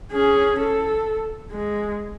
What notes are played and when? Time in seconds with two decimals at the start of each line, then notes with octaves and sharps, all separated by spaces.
0.12 C#4 G#4
0.59 A4
1.52 G#3